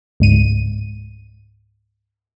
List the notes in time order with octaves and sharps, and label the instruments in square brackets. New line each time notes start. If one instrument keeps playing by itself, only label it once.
[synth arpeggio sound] C#2 G#2 D#7